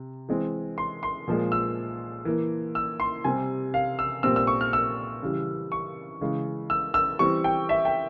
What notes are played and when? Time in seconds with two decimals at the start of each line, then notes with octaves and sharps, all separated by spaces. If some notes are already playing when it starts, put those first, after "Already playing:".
Already playing: C3
0.29 E3 G#3 C4
0.78 C6
1.03 C6
1.28 A#2 F3 G#3
1.52 E6
2.25 E3 A#3
2.75 E6
3.00 C6
3.24 C3 G3 C4 G#5
3.74 F5
3.99 E6
4.23 A#2 G3 C4 E6
4.36 E6
4.47 C#6
4.61 F6
4.73 E6
5.22 C#3 E3 G3
5.72 C#6
6.21 C#3 E3 G#3
6.70 E6
6.94 E6
7.19 E3 G3 C4 C#6
7.44 G5
7.69 E5
7.85 G5